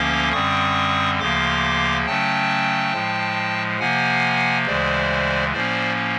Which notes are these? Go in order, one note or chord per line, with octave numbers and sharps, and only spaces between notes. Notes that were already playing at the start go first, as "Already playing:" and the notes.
Already playing: D2 D3 F3 A#3 C#4 C6 D6
F#2 D3 G3 C4 C#6 D#6
D2 C#3 F3 A#3 C6 D6
C#3 F#3 A3 C#4 G5 A5
A2 F3 G#3
C3 F3 A#3 F#5 G#5
D2 C#3 E3 G#3 C5 D5
A2 F3 A#3 C#4 C5 D5